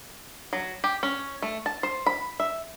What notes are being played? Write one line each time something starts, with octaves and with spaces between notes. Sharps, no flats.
F#3
G4
C#4
A3
A5
C5
B5
E5